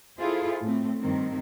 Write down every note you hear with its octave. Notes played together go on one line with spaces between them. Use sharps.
E4 F4 G#4 A4 C5
A2 A3 C4
G2 D#3 C4